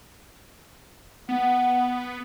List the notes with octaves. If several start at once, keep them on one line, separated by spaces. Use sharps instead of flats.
B3 F#5